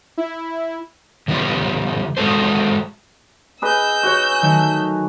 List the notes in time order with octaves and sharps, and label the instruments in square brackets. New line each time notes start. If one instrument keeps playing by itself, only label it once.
[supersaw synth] E4
[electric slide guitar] C#3 E3 G3 B3 F4
G#3 F#4 G#4 A4 C5
[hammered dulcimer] G#4 B4 D#5 [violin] E6 G6
[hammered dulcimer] F#4 C#5
[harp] D#3 F#3 A3